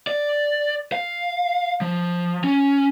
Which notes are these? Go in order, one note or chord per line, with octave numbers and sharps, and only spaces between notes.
D5
F5
F3
C#4